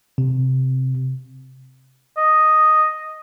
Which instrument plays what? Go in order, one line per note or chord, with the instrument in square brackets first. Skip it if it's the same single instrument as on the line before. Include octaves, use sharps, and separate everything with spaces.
[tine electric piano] C3
[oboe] D#5